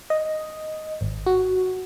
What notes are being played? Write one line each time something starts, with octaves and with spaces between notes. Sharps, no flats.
D#5
G#1
F#4